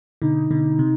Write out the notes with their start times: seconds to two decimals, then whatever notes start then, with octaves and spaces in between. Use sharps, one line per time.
0.22 B2 D3 D#4
0.51 B2 D3
0.79 C3